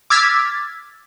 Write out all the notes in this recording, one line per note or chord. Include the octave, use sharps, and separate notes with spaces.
D6 E6 F6 G#6 A6 B6